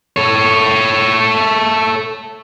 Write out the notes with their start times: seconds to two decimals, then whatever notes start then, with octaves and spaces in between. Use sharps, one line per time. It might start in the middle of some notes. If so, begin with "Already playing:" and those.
0.16 A4 C#5